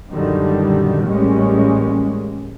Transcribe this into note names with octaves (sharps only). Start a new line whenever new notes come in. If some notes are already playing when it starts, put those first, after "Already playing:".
F#2 A#2 D3 D#3 G3
A1 G3 G#3 A#3 C#4